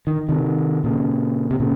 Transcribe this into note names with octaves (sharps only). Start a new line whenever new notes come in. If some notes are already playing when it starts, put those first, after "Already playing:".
D#3
C3 D#3
A#2 C#3
C3
A#2 C#3